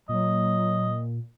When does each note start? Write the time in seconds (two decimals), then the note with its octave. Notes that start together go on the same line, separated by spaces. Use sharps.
0.09 A#2 F#3 D#5